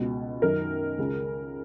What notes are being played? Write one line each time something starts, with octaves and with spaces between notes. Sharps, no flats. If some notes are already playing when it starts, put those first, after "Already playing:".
Already playing: C#2 B2
F#2 D#3 A#4
C#2 C#3